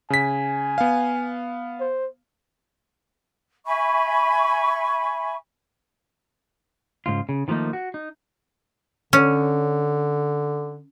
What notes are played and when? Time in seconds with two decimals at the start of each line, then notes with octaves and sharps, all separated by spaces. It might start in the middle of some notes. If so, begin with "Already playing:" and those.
0.10 C#3 G#5 B6
0.78 B3 F5
1.80 C5
3.66 E5 G#5 B5 C#6
7.06 G#2 C#3 F4
7.29 C#3
7.48 D#3 F3 A3 A#3 D#4
7.73 F#4
7.94 D#4
9.13 D3 C#4